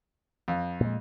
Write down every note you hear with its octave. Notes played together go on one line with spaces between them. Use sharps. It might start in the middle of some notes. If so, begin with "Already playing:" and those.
F2
A#2 G#3